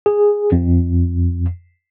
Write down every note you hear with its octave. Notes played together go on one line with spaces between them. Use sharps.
G#4
F2